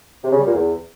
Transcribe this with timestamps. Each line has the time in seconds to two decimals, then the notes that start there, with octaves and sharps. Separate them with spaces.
0.24 C3
0.32 C#3
0.39 G3
0.47 A#2
0.54 E2